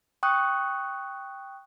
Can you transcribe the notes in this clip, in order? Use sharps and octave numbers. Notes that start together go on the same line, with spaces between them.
G5 C#6 D#6 F#6